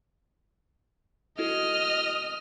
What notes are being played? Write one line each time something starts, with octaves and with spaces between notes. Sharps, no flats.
E4 F#4 A4 D#5 F6